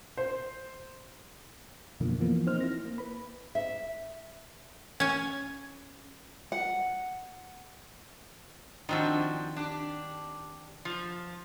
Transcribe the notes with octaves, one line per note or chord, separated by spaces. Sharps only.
C5
F#2 B2 D3 F3 A#3
E3 F3 A#3 B3
C4 D#4 C5 F6
E4 A#6
A#3
B4 B5
E5
C#4 G#5
F#5
D#3 F3 C4 D4 F#4 E5
D4 G4
F3